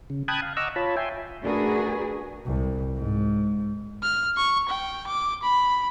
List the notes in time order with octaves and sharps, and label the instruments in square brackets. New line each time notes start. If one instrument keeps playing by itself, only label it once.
[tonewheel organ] C#3
G5 A5 B5 D#6 F#6 G#6
F5
D#5 F#5 A#5 C#6 D6 E6
F4 C#5 A5 B5
E5 G5 G#5 C6
[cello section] A3 D4 F#4 G#4 A#4 B4
[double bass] C2
G#2
[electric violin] F6
C#6
G5
D6
B5